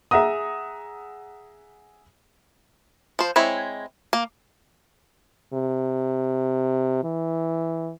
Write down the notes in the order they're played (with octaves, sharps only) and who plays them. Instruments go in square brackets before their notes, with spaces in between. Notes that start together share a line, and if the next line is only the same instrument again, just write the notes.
[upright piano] G#4 E5 F#5 A#5 D#6
[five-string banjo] F3 C5
G#3 C4 E4 C#5
A#3
[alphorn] C3
E3